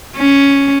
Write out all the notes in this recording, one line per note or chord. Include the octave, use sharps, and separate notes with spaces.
C#4